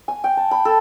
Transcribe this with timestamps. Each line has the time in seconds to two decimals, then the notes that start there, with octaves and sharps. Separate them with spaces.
0.08 G#5
0.24 G5
0.37 A5
0.51 B5
0.65 A4